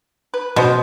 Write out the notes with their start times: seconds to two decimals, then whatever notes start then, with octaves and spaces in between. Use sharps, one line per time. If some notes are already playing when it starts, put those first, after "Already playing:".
0.34 B4
0.56 B2 G#3 C#4 C5